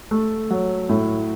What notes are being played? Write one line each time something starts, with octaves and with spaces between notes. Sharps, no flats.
A3
F#3
A2